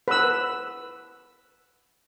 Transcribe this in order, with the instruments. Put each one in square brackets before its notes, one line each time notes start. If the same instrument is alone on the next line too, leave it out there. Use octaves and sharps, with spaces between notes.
[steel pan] B4 E6